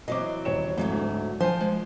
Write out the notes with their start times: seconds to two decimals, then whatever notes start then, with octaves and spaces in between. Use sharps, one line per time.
0.08 E3 F#3 C4 D#5 D6
0.45 D#1 C#5 E7
0.77 F2 G#2 F#3 A3
0.92 D2
1.40 F3 C5 G#5
1.61 G#3